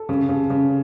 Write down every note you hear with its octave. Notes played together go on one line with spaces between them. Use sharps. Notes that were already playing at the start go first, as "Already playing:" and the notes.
Already playing: A4
C#3
C#3
C#3